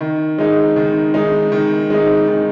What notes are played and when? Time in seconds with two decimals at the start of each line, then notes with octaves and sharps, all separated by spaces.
0.01 D#3
0.38 G#3 D#4
0.76 D#3
1.14 G#3 D#4
1.52 D#3
1.90 G#3 D#4
2.27 D#3